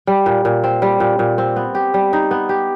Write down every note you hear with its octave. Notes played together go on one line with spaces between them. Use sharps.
G3
A#2
A#2
C4
G3
A#2
A#2
C4
B3
G4
G3
D#4
B3
G4